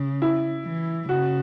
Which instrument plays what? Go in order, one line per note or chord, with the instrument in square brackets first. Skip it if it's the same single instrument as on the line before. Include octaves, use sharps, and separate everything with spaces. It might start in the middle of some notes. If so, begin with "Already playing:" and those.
Already playing: [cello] C#3
[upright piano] E4
[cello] E3
[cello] C#3 [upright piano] F#4